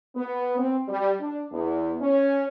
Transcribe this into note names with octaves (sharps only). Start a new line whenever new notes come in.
B3
C4
G3
D4
E2
C#4